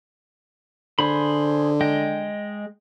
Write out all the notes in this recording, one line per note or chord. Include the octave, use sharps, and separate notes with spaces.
D3 G#4 C5 B5
G#3 D#5 G5